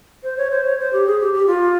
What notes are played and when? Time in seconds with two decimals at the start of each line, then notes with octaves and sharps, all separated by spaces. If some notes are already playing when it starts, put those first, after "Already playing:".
0.23 C5
0.37 C#5
0.51 C5
0.65 C#5
0.79 C5
0.93 G4
1.07 G#4
1.21 G4
1.34 G4
1.47 F4